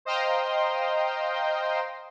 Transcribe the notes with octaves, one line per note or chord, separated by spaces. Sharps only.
C5 D#5 F5 G5 A#5 C6